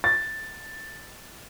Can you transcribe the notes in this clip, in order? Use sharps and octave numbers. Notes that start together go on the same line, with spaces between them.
A6